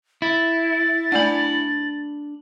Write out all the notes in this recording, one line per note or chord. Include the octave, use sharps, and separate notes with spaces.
E4 A6
A3 D4 D5 F#5 B5